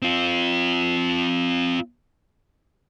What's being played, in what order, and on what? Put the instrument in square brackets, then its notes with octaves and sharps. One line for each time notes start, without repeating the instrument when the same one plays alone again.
[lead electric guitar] C4 F4